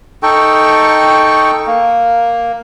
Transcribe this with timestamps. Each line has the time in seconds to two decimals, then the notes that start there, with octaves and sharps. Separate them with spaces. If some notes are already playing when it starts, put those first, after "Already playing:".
0.23 D#4 A4 G5 C#6
1.67 A#3